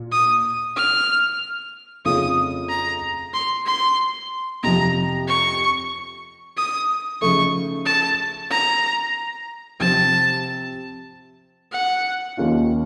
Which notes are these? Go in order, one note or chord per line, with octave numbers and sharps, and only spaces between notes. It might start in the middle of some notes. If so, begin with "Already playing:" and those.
Already playing: A#2 F4
D#6
F6
F2 C#3 A3 C#4 F4 D#6
A#5
C6
C6
F2 C3 F3 A#5
C#6
D#6
C#3 F3 A3 D#4 C#6
A5
A#5
C3 F3 C4 A5
F#5
D#2 D#3 A#3 C#4 F4